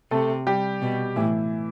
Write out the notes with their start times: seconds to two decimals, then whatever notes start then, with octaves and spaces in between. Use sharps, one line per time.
0.11 C3 A3 A4
0.47 G3 G4
0.81 B2
1.16 A2 E3 E4